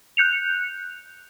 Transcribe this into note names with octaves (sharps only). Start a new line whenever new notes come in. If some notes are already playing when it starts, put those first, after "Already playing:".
F#6 G6 C#7 F7